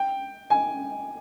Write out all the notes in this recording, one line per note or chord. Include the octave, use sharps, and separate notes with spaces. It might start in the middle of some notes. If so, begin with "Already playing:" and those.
Already playing: G5
G#5